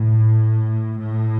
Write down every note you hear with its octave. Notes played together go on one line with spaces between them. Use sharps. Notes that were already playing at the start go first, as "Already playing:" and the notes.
Already playing: A2
A2